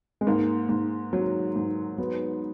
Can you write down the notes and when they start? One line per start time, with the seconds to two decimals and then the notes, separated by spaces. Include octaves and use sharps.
0.21 G#3
0.27 G#2 A#3
0.69 G#2
1.13 F#3
1.56 G#2
1.98 F#3 B3